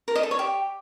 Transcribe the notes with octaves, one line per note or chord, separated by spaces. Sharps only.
A#4
D#5
A4
C#5
G4